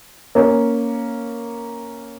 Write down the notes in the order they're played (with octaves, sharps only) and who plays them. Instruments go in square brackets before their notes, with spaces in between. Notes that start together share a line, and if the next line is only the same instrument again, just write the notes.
[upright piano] A#3 C#4